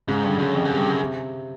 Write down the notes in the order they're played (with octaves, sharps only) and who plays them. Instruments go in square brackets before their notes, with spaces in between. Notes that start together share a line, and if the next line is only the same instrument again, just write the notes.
[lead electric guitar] G#2 [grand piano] C#3
[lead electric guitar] G2 [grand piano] D3
[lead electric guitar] F#2 [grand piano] C#3
[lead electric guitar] F2 [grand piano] C3
[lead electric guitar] F#2 [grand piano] C3
[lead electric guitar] G2
[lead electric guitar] F#2 [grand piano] C#3
[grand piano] C3